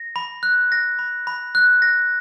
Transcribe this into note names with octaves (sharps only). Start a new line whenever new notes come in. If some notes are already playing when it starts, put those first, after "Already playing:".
Already playing: A#6
B5
F#6
A#6
B5
B5
F#6
A#6